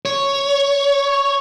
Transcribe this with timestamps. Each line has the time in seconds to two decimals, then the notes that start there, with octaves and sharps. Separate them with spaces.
0.05 C#5